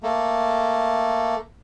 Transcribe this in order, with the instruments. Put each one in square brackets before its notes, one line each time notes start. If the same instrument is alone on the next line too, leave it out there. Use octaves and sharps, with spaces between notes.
[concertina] A3 A#3